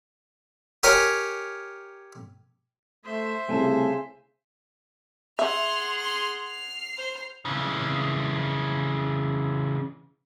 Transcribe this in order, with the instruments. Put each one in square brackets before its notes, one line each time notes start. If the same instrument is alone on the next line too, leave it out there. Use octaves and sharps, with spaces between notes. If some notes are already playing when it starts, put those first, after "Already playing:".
[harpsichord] G4 A#4 C#5 G#5
[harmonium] A3 [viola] C5 E5
[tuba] C2 [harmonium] C#3 G#5 [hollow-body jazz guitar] A3 C#4 A4
[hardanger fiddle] G#4 F#5 [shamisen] E5 [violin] C6 F6
[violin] C6 F6
F6 C7
[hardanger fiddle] C5
[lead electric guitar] C#3 E3